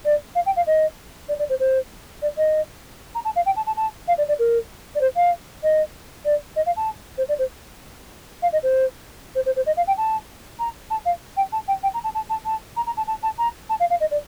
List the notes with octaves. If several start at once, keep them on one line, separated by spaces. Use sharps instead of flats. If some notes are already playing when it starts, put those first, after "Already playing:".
D5
F5
G5
F5
D#5
D5
D5
C5
C5
D5
D#5
A#5
A5
F5
G5
A5
A5
A5
F5
D5
D5
A#4
D5
C5
F5
D#5
D5
D#5
F5
A5
C5
D5
C5
F5
D#5
C5
C5
C5
C5
D#5
F5
G5
A5
A#5
A5
F5
G5
A5
G5
G5
A#5
A5
A5
A5
A5
A#5
A#5
A5
A5
A5
A#5
A5
F5
F5
D#5
D5